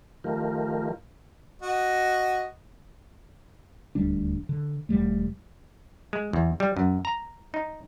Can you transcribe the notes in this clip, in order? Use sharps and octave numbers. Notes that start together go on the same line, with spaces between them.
D#3 F3 A3 F4 G4 A#4
F#4 D#5
D#1 D2 G3 D4
D3
E1 C#2 G3 A3
G#3
E2
G3
F#2
A#5
D#4